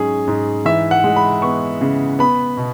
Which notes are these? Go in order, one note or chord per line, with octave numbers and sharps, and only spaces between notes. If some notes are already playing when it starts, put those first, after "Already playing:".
Already playing: G#2 F#3 C#4 G#4
G#2
E3 E5
F#5
G#3
B5
B3 C#6
C#3
B3 B5
B2